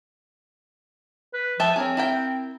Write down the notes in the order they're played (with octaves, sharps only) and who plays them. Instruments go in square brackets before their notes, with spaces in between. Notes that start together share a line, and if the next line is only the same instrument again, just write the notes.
[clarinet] B4
[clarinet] F3 [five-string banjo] E5 G5 A5
[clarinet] C4 [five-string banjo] G#4 A#4 C#5
[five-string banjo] E4 A#4 G5